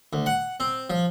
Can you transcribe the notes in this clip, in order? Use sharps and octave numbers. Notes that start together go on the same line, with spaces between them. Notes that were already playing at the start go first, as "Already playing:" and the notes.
D2
F#5
C4
F3